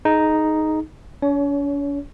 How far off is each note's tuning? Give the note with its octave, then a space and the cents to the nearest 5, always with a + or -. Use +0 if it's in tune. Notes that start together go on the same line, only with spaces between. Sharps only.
D#4 +0 G#4 +25
C#4 +45 C#5 +25